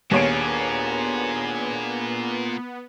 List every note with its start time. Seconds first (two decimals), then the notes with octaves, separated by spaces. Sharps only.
0.11 D#2 A#2 B3 D4 G#4 C#5 G#5 D7